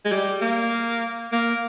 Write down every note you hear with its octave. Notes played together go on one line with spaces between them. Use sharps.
G#3
G3
A#3
A#3